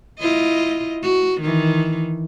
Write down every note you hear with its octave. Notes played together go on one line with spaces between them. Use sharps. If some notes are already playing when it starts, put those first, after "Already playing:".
E4 F4 D#5
F#4
D#3 E3